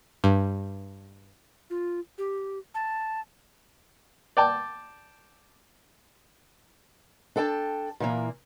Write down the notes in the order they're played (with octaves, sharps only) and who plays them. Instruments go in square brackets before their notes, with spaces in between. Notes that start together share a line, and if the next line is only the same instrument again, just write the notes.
[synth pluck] G2
[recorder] F4
G4
A5
[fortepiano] D5 G5 A5
[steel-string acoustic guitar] D4 A4 G5 A5
A#2 E3 A#3